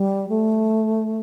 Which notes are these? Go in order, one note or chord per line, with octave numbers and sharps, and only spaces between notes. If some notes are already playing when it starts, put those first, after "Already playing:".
Already playing: G3
A3